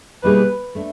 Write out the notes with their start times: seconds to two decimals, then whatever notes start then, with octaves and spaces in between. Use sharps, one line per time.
0.23 B2 G3 A#3 D#4 G#4 B4
0.75 A3 D4